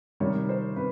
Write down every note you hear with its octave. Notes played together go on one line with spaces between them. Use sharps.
C3 D#3 G3 C#5
C5
C3 B4